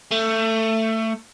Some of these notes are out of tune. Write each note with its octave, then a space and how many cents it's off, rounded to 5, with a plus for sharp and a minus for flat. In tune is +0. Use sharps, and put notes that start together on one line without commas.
A3 +20